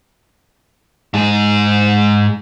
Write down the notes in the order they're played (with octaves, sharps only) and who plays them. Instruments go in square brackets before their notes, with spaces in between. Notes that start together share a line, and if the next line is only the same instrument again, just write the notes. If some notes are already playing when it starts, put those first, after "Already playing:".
[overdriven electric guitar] G#2 G#4